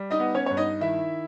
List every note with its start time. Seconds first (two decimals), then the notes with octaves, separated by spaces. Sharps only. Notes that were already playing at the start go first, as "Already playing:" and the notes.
Already playing: G3
0.11 D#4 D#5
0.19 B3
0.34 C#4 C#5
0.46 G2 C#5
0.57 D#4 D#5
0.81 D#3 E4 E5